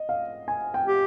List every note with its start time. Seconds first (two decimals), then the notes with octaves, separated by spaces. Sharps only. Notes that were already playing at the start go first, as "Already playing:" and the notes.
Already playing: D#5
0.09 F5
0.48 G#5
0.74 G5
0.87 G4